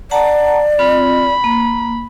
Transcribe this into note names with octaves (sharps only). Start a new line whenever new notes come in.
D5 F#5 A5 A#5
C4 F4 B5
A#3